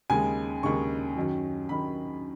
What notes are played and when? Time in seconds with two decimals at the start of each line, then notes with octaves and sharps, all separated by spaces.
0.10 D#2 C#3 G#3 G#5
0.63 D#2 C#3 G#3 C#6
1.16 F#2 D#3 F#3
1.69 F#2 D#3 F#3 B5